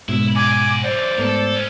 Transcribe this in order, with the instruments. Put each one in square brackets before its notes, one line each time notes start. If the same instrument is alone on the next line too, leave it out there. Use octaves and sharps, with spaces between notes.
[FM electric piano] G#2 B2 [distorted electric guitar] E4
[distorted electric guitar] F#4 D5 [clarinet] G#5 [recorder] D6
[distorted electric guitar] F#2 E3 [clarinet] C5 [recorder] D5
[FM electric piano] G#2 A3 B3 [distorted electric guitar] A4 A#4
[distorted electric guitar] G#3 C#4